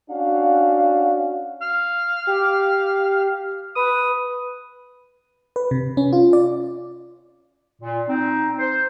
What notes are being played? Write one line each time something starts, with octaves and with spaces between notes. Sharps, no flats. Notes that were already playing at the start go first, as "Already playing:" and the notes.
C#4 D4 F#4 F5
F5
G4
B4 D#6
B4
C3
C#4
F4
D5
A#2
C4 D#4
C5